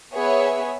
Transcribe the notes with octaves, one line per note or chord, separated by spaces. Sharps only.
B3 G#4 C#5 E5